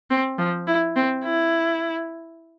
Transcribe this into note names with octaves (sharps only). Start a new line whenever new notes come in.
C4
F3
E4
C4
E4